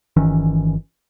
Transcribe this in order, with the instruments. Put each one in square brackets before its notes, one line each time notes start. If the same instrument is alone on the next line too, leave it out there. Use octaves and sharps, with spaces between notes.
[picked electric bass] G1 D#3 E3 C#4